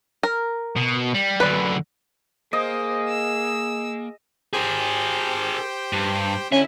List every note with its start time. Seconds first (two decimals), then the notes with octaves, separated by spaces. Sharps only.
0.23 A#4
0.76 B2
1.14 G3
1.40 F#2 D3 B4 D5
2.53 A#3 G#4 C5 D#5
3.08 E6
4.53 G4 G#4 A#4 C5 G5
5.93 G2
6.52 D3 C#4 E4 E5